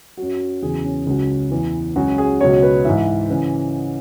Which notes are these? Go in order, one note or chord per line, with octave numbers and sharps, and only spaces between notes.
F#2 F#3 F#4
E2 C#3 F#3 G#4
C#4
C#2 C#3 F#3
E2 E3
C#2 C#3 F#3 F#4
G#4
C#2 B2 F#3 C#5
B4
G#2 E3 E5
C#3 E3